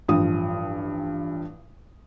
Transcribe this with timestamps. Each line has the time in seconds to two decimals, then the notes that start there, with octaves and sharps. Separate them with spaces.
0.08 A1 G2 F3 D#6